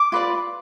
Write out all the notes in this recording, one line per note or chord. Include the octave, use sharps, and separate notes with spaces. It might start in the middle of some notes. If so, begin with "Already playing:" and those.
Already playing: D6
F4 B4 D5